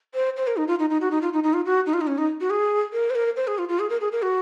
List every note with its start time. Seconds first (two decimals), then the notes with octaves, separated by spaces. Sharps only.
0.14 C5
0.37 C5
0.47 A#4
0.57 D#4
0.68 F4
0.79 D#4
0.90 D#4
1.01 F#4
1.11 D#4
1.22 F4
1.33 D#4
1.43 D#4
1.54 F4
1.65 F#4
1.86 D#4
1.94 F4
2.01 D#4
2.07 C#4
2.18 D#4
2.41 F#4
2.50 G#4
2.93 A#4
3.10 C5
3.15 A#4
3.37 C5
3.47 G#4
3.58 F4
3.69 F4
3.79 G#4
3.90 A#4
4.01 G#4
4.12 A#4
4.22 F#4